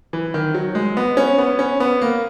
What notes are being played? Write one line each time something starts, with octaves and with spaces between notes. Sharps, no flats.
E3
D#3
F#3
G#3
B3
C#4
B3
C#4
B3
A#3